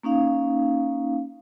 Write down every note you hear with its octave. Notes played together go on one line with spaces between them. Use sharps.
A#3 C#4 D#4 F5